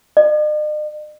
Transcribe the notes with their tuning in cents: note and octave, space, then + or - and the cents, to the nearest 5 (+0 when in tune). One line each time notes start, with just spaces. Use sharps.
D#5 -45